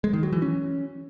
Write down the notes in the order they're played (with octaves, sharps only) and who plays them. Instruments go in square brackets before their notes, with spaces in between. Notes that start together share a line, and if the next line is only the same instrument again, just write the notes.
[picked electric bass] G#3
D#3
F#3
E3
C#4